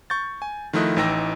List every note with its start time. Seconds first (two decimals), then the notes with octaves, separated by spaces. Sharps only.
0.10 C#6 G6 A6
0.42 G#5
0.73 D#3 F3 A3 E4 D#5 F#6
0.96 A1 E3 D#4 G5 E6 A#6